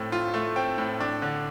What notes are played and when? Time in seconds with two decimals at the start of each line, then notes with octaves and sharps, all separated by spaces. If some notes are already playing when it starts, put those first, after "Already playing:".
Already playing: A2 A3 C4
0.12 F4
0.34 A3
0.56 C4 G5
0.78 A2
1.00 D4
1.22 D3